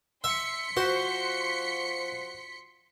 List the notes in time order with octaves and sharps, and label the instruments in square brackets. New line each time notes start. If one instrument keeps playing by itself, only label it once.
[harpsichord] E5 [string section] C6 B6 C#7
[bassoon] F3 [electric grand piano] F#4 F#5 [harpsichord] C5